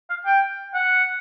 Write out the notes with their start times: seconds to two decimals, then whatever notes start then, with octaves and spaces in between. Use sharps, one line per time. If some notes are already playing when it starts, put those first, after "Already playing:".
0.10 F5
0.26 G5
0.74 F#5